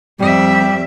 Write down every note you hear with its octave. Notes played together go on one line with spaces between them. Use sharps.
F2 G3 E5